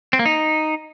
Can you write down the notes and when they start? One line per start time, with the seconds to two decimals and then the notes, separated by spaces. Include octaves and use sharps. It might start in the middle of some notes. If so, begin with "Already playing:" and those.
0.13 C4
0.19 A#3
0.26 D#4